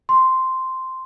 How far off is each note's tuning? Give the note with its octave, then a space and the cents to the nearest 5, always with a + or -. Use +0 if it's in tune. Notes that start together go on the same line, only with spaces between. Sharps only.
C6 -5